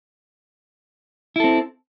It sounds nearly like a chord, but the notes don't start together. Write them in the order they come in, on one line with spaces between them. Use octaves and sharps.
E4 A4 C4